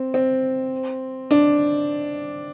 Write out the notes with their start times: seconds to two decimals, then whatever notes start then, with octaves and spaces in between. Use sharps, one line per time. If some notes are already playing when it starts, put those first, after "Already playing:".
Already playing: C4
0.14 C4
1.31 D4